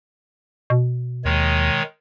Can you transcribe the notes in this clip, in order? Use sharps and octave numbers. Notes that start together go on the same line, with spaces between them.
B2
D#2 D#3 G#3 C#5